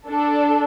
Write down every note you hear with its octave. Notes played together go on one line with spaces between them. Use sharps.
D4 A4